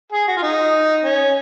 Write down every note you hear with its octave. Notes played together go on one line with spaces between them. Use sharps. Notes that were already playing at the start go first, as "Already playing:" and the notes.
G#4
F#4
F4
D#4
C#4